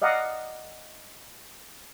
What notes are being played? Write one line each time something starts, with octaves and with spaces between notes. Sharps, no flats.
D5 D#5 F5 F#5 A#5